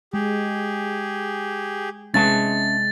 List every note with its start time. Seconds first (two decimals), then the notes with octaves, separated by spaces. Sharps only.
0.14 G#3 G4 G#4
2.14 C3 G#3 C#4 E5 A5 A6